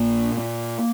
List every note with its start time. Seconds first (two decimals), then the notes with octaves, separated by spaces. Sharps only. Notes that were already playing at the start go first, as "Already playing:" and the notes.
Already playing: A#1 A#2 A#3
0.39 A#2